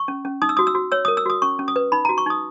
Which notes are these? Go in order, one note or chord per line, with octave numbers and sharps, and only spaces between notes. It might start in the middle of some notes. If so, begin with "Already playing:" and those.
Already playing: C#6
C#4
C#4
D#4 D#6
E6
F#4 D#6
E6
F#4
C#5 E6
A#4 D#6
E6
F#4 D#6
C#4 C#6
C#4
D#6
B4
D#4 B5
F#4 A#5
C#6
D#4 D#6